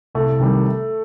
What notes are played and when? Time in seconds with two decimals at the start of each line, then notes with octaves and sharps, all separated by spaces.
0.15 C2 A3
0.39 C3 D#3 G3